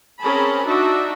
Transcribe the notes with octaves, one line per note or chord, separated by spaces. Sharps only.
C4 C#4 G#4 A#4 A5 B5
D4 D#4 F#4 E5